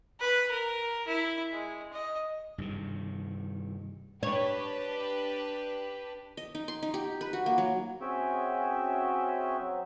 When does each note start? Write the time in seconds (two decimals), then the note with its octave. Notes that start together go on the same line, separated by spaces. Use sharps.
0.20 B4
0.50 A#4
1.07 E4
1.53 G#3
1.93 D#5
2.58 G2 C3 D#3
4.23 D4 G4 B4 C#5
6.37 D#5
6.55 D#4
6.68 C6
6.83 D#4
6.94 G4
7.21 B4
7.33 F#4
7.46 A#3
7.58 F#3
8.01 C4 C#4 F#4 G#4 E5 G5
9.60 F#3 C4